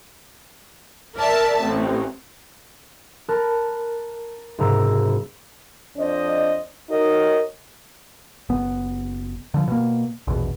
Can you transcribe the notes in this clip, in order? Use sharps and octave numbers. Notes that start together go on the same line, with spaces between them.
A#4 D5 E5 A5
A1 C4
A#4 A5 B5 F#6 A6
F#1 G#2 C3 G#4 A#5 E6
F2 D4 C5 D#5
D#4 F#4 A#4 C#5 D#5
F#1 B3
D3 F3
B2 A#3
A#1 E2 B2